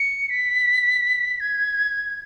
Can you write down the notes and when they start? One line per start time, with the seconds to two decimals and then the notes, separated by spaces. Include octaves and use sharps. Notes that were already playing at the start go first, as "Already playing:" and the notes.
Already playing: C#7
0.30 B6
1.40 G#6